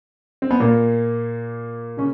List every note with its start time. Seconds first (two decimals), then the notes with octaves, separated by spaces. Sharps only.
0.42 C4
0.51 B3
0.60 A#2 A#3
1.97 C#3 C#4